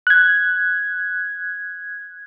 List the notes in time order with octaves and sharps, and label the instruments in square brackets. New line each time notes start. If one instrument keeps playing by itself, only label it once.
[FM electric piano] F#6 G#6